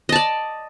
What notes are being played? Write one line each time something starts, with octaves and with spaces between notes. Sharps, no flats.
D5 D#5 A5